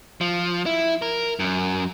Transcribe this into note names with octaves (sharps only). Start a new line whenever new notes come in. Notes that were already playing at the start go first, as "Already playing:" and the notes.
F3
E4
A#4
F#2